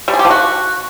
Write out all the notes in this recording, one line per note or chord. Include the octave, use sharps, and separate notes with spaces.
G3
G#4
G4
F3
F#4